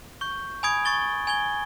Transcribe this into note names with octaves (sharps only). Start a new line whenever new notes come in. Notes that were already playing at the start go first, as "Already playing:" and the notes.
C#6 G6
G#5 B5 D#6 G#6 D7
C#6 D#6 A6 G7
G#5 G#6 G7